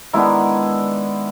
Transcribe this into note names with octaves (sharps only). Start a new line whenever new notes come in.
D#3 G#3 B3 D4 E4